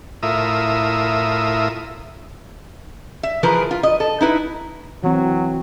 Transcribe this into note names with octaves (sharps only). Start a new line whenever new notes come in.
A2 E4 F4 A#4 E5 D#6
E5
E3 F3 G#4 A#4 B4
F4
D#5
A4
D#4 E4 B4
E3 F#3 C4